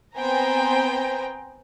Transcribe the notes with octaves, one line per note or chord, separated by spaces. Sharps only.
B3 C4 C5 G5 G#5 A#5